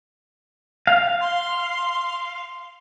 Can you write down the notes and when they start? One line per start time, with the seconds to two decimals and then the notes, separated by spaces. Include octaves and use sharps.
0.87 F5
1.21 C6